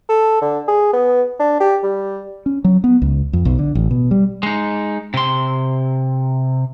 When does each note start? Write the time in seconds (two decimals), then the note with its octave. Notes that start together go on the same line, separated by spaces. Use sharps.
0.09 A4
0.42 D3
0.68 G#4
0.93 B3
1.39 D4
1.60 G4
1.84 G3
2.46 C#4
2.64 F#3
2.84 B3
3.02 C#2
3.33 F2
3.45 B1
3.59 D3
3.75 A1
3.91 B2
4.11 G3
4.43 G#3 D#4
5.14 C3 C6